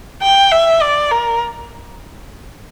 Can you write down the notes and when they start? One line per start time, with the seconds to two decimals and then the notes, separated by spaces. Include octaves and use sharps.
0.22 G5
0.51 E5
0.81 D5
1.11 A#4